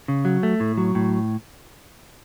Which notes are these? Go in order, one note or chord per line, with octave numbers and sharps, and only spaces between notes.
C#3
F#3
A3
A2
F#3
A2